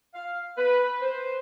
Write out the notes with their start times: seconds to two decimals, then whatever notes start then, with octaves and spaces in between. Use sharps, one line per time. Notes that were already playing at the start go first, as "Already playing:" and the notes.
0.14 F5
0.58 B4
1.00 C5